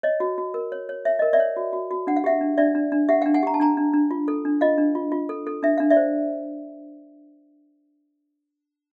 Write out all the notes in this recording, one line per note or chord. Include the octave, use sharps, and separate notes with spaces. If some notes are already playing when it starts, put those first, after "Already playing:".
C#5 D#5
F#4
F#4
A#4
C#5
C#5
C#5 E5
A#4 D#5
D5 E5
C#5
F#4
F#4
F#4
D4 F#5
F5
G4 E5 F#5
D4
D4 D5 E5
D4
D4
G4 E5 F#5
F5 G5
D4
F#5 G#5
G4 A#5
A5
D4 G#5 A#5
D4
D4
F4
A4
D4
F4 D#5 F5
D4
F4
F4
A4
A4
D4 E5
D4 F5
D5 E5
C5